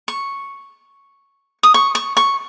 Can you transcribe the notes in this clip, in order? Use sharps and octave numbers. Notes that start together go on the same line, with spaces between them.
C#6
D#6
C#6
C#6
C#6